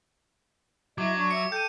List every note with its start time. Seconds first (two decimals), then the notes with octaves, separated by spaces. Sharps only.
0.98 F#3 E4 D#5 E5 D6
1.15 D4 C#6
1.31 E5 C#7
1.52 A4 G5 A5 G6 D#7